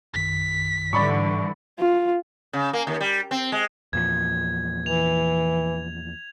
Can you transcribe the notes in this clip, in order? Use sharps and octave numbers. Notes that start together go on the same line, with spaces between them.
A#1 F#2 D#3 B6
G#2 D3 E3 G3 D5 B5 C#6
F4
C#3
A#3
D#2
G3
C4
G#3
E2 A#2 F3 G#6
E3 F7